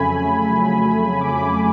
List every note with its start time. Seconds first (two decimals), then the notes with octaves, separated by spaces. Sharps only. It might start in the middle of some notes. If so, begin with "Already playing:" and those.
Already playing: F2 C#3 F#3 A3 G#5 B5
1.20 B5 D6